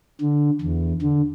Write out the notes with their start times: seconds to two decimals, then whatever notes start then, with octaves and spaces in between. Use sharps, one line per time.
0.21 D3
0.61 E2
1.02 D3